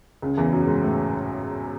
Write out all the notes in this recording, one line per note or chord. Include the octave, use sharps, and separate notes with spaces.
C#2 C#3
E2 E3
F#2 F#3
G#2 G#3
A2 A3